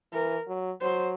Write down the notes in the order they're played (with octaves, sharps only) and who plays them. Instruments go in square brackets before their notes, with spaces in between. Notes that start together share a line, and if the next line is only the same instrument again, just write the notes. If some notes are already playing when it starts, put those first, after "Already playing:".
[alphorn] E3 [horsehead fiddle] A#4
[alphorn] F#3
[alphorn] F#3 [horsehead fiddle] C5